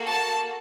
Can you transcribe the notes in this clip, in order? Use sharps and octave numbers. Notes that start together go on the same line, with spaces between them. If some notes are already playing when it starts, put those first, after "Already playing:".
Already playing: A#3 F#4 A4
A5